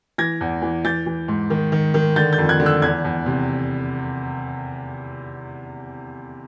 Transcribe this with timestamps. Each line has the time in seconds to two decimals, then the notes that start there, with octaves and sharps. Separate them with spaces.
0.18 E3 G#6 A#6
0.41 E2
0.62 E3
0.85 E3 G6 A6
1.06 E3
1.28 G#2
1.50 D#3
1.72 D#3
1.94 D#3
2.16 D3 G6 A6
2.33 G6 A6
2.38 F2
2.49 F#6 G#6
2.60 D3
2.66 E6 F#6
2.82 E2 F#6 G#6
3.05 E2
3.26 C3